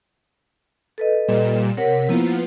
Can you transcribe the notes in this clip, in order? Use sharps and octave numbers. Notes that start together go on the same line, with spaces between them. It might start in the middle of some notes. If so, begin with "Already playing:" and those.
A4 B4 D#5
A#2 G3 E7
C3 A#4 C#5 F#5 B6
F3 A#3 B3 E4 F4